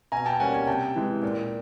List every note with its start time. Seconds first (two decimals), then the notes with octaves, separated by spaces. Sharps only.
0.12 B2 G#5 A#5
0.26 G5 A5
0.40 G3 A#3 C#4 F#5 G#5
0.53 F#5 G#5
0.67 C3 G5 A5
0.96 E3 G#3
1.23 A#2